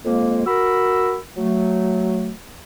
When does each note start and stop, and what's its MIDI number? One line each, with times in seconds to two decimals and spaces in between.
0.03 0.44 41
0.03 0.44 56
0.03 0.44 58
0.46 1.15 66
0.46 1.15 70
0.46 1.15 83
0.46 1.15 88
1.37 2.30 54
1.37 2.30 57